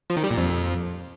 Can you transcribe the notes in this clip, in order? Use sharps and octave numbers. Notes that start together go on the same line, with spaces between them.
F3
D#3
G3
A#2
F2